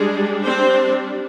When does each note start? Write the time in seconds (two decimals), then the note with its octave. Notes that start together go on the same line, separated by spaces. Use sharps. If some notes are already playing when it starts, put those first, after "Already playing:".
Already playing: G3 G#3 D4 G#4
0.45 C4 C5